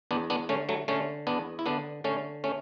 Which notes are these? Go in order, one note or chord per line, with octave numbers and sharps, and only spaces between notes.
E2 B3 D4
B3 D4
D3 A3 C#4
F#3 A3
D3 A3 C#4
E2 B3 D4
E4
D3 B3 D4
D3 A3 C#4
A3 C#4